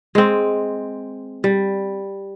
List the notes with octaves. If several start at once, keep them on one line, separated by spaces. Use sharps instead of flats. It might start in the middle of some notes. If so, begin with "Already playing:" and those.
G#3 C4
G3